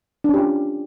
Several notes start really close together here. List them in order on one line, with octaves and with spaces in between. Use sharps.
D4 C#4 G4 F4